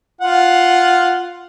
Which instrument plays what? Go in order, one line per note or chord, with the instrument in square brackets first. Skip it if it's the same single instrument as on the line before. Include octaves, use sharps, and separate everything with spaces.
[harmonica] F4 F#5